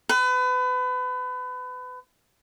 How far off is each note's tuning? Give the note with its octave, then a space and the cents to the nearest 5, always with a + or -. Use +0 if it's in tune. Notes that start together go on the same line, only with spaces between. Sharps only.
B4 +30